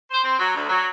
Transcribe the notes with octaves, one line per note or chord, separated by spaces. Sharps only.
C5
C4
F#3
D2
F#3